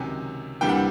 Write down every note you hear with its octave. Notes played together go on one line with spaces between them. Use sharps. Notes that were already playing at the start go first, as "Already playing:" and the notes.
Already playing: C#2 C3 D#3 F#3 G#5
D2 C3 E3 G3 A#3 G5
F#5